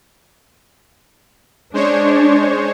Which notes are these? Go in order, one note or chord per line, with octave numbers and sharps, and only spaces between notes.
G#3 D4 C5 C#5